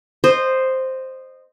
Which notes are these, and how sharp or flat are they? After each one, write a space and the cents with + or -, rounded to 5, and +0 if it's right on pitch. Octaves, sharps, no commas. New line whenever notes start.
C5 +0 D#5 -20